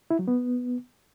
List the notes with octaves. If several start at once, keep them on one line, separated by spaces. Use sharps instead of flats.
E4
F#3
B3